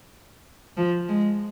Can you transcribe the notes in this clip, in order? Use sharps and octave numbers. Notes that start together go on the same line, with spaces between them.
F3
G#3